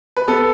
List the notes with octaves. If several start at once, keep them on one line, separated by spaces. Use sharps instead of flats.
B4
B3 A4